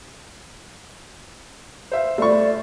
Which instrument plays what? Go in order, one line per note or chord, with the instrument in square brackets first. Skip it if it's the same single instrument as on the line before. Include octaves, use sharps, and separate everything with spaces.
[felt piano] C5 E5 F5
[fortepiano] A3 C#6 [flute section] D5